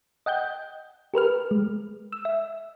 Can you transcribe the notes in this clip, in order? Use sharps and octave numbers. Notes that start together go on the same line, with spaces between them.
D#5 F#5 G5 G6
G4 A#4 B4 F6
G#3
E6
E5